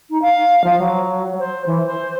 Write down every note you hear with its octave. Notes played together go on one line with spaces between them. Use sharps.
D#4
F5
F3
F#3
C5
E3
C5